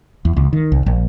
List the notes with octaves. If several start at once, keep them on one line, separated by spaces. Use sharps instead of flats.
E2
C#2
D#3
C2
A#1